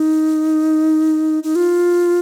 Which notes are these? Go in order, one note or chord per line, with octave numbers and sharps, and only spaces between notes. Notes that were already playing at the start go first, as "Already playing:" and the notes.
Already playing: D#4
D#4
F4